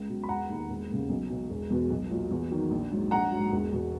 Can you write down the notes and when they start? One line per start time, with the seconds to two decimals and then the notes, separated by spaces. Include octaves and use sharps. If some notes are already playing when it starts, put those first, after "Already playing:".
Already playing: C#2
0.09 B2 F#3
0.23 B5
0.29 E1 F#5 A#5
0.49 D#2 D#3
0.69 E1
0.90 D#2 C#3
1.09 B1
1.30 B2 F#3
1.50 E1
1.70 E2 B2
1.90 B1
2.10 A#2 F#3
2.31 E2
2.51 D#3 F#3
2.71 A#1
2.91 G#2 F#3
3.11 A#1 F#5 A#5
3.31 G#2 F#3
3.52 E1
3.72 E2 B2